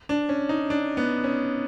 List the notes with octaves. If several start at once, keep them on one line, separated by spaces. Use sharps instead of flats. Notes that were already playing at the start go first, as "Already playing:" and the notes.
D4
C#4
D#4
D4
B3
C#4